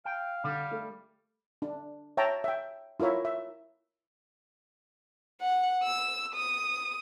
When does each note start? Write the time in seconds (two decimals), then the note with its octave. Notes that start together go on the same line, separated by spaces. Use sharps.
0.05 F5 G5
0.44 D3 G3
0.71 A3
1.62 D4
2.17 C#5 E5 G5 A5 A#5
2.44 E5 G5
3.00 E4 F4 A#4 C#5 E5
3.25 E5
5.42 F#5
5.84 E6
6.35 D#6